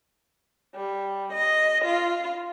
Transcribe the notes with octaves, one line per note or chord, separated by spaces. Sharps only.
G3
D#5
F4